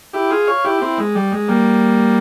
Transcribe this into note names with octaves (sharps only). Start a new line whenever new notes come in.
E4 G4
F4 G#4
C#5 F5
E4 G4
C4 E4
G#3
G3
G#3
G3 A#3